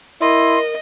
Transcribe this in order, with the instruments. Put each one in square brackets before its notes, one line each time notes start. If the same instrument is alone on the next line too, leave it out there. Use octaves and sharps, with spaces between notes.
[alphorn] E4 [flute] A#4 [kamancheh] D#5 [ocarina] C6